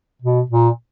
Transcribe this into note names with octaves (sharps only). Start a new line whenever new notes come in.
B2
A#2